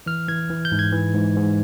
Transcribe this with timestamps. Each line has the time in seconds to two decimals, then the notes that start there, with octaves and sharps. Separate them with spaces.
0.06 E3 F6
0.28 E3 G#6
0.50 E3
0.65 G6
0.72 G#2
0.79 G#6
0.92 E3
1.14 G#2
1.36 G#2